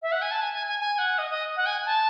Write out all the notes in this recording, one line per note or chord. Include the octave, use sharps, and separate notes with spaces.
E5
F#5
G#5
A5
G#5
G#5
G#5
G#5
F#5
D#5
D#5
F#5
G#5
A5